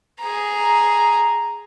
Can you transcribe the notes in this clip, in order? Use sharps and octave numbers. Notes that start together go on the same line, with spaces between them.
G#4 A#5